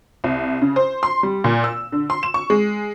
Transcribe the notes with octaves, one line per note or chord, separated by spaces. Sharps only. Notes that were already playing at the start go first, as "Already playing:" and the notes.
C2
C#3
C5
C6
G3
A#2
E6
D3
C6
E7
C#6
G#3